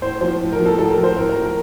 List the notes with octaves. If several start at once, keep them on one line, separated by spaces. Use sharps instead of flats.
A2 C5
F3 C5
A2
A#4
F3
A4
A2 A4
A#4
F3
C5
A2 A#4
A#4
F3
A#4